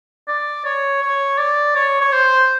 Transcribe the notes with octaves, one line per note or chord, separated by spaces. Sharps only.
D5
C#5
C#5
D5
C#5
C#5
C5